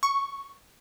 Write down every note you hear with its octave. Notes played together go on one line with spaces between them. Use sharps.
C#6